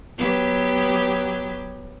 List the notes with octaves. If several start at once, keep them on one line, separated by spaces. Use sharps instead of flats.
F#3 B3 G4